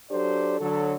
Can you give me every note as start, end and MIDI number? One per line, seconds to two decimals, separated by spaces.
0.10 0.57 54
0.10 0.57 62
0.10 0.57 67
0.10 0.57 69
0.10 0.57 72
0.10 0.57 74
0.60 0.95 50
0.60 0.95 54
0.60 0.95 69